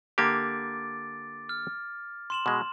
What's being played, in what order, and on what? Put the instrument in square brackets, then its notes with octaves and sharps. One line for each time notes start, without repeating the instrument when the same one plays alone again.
[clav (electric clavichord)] D3 A#3 G4 [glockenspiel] D6 A6 D7
[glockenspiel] F6
C6 E7 F#7
[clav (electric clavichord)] B2 G#3